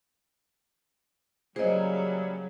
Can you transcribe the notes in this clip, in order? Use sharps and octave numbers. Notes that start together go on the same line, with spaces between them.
C#3 F#3 G3 A#3 G#4 C5 D#5